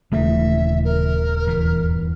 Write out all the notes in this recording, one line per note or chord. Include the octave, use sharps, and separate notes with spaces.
D#1 C#3 E3 A3 E5
A#4
E2 G2 E3